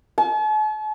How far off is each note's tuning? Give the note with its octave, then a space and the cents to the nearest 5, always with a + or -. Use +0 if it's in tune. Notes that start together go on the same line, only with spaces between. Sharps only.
A5 -45